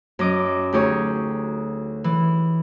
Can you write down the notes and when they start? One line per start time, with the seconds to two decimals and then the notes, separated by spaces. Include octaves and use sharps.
0.19 F#2 D#5 D6
0.73 D2 D#4 G4 G#4 C#5
2.04 E3